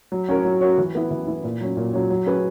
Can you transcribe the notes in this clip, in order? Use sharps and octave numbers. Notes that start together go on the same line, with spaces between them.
F#3
C#4 F#4 A#4 C#5
F#3
C#4 F#4 A#4 C#5
E3
B3 E4
E3
B3 E4
A#2
F#3 C#4
A#2
F#3 C#4
F#3
C#4 G#4 B4